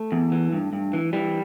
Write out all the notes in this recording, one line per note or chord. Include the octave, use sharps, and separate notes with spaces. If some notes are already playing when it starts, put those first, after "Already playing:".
Already playing: A3
E2
E3
G2
G2
E3
E3 G3